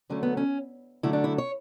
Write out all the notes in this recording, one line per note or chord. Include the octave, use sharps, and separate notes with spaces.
D3 F#3 A3 C#4
B3
C#4
D3 F#3 A3 E4
D4
E4
C#5